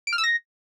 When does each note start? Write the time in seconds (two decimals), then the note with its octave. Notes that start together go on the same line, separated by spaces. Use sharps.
0.07 D7
0.13 F6
0.18 E6
0.24 A#6